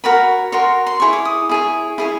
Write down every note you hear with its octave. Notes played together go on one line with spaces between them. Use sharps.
F#4 A#4 C#5 B5
F#4 A#4 C#5 C6
C6
E4 G#4 C#5 C#6
D6
D#6
E4 G#4 C#5
E4 G#4 C#5